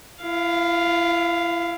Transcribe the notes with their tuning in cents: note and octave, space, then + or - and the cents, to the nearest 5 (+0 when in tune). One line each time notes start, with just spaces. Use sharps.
E4 +35 F5 +0